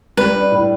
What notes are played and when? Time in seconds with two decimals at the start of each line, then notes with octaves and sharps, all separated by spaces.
0.17 G3 B4
0.35 D4
0.52 A2